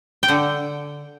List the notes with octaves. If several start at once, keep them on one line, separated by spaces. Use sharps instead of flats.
G5
D3 F#5